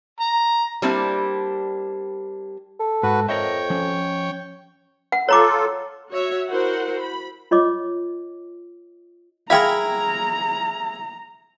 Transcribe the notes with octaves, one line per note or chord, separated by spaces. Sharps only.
A#5
G3 A#3 C4 D4 E4 G4
A4
G#2 F#4 B4
F2 A#4 C#5 D#5 E5 G5
F3 C#4
F#5
F4 A4 C#5 A#5 D6
F#4 C#5 E5
E4 F#4 A#4 C5 F#5
B5
F4 C#5 D#5 D6
E4 G#4 A#4 F5 G5 A#5 B5